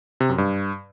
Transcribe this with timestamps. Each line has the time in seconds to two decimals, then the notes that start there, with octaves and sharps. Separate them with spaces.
0.20 C3
0.29 F#2
0.38 G2